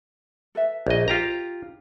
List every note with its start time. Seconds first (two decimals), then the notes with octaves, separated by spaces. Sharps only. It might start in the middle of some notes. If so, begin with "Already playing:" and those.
0.55 A4 B4 E5
0.87 A#1 D#5
1.08 F4 G4 A#5